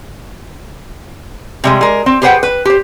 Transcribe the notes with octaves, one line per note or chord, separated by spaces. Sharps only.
C3 G3 G#3
G#3 A#4
C4
G4 G#4 B4 C5 F#5 G5
B4
G4 C5